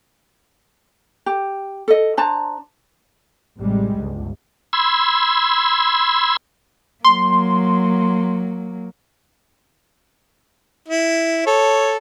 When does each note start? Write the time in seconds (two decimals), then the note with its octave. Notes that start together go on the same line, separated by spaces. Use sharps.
1.26 G4
1.88 A4 D#5
2.17 D4 C5 A5 A#5
3.58 A1 C3 G3 G#3
3.98 G1 C#2
4.73 B5 C6 E6 G#6
7.05 F#3 A#3 C6
10.88 E4
11.46 A4 C#5